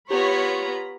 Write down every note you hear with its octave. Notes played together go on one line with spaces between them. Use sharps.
B3 F4 G4 C#5 A#5 B5